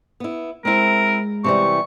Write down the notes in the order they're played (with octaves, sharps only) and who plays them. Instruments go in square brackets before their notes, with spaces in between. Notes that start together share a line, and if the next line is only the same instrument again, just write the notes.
[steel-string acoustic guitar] B3 E4
[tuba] G#3 [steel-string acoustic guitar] C4 E4 [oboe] A#4
[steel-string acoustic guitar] C3 E3 G3 [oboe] C#6